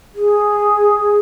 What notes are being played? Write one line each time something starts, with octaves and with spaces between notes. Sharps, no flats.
G#4